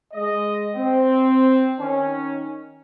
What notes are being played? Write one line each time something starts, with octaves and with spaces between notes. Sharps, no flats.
G#3 D#5
C4
D#3 C#4